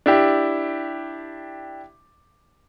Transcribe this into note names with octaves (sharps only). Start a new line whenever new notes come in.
D4 E4 G4